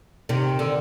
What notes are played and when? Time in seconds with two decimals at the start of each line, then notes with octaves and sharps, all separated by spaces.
0.29 C3 D#3
0.59 D3